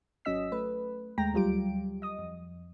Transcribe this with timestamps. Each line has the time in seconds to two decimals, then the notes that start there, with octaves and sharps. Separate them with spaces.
0.25 G#1 F#3 C#4 D#5 E6 B6
0.52 A3 B4
1.18 D#2 G#3 A3 G5 A#5 A#6
1.33 D2 F#3 G3 F4 G4 D7
2.02 D#5 D#6
2.18 F2